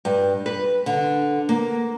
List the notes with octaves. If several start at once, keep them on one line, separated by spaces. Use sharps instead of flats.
G2
B4
D3
A#3